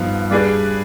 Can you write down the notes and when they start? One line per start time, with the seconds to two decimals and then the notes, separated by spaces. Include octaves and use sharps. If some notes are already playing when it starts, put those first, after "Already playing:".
Already playing: G2 F3 B3 D#4
0.31 G3 D4 G#4 B4 D5